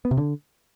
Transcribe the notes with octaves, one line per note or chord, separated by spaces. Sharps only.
B3
C3
D3